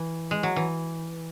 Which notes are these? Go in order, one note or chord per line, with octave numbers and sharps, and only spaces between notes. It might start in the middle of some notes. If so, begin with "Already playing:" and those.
Already playing: E3
G#3
F#3
E3